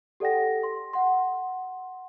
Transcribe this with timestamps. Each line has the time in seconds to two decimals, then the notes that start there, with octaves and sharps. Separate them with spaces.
0.20 G4 A4 D5 F#5 G5 A#6
0.63 C6
0.93 F#5 C6